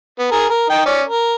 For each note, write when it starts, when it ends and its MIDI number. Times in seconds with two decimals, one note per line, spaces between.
0.19 0.27 59
0.31 0.46 68
0.31 0.46 70
0.50 0.67 70
0.70 0.83 63
0.70 0.83 79
0.86 1.02 61
0.86 1.02 74
1.08 1.36 70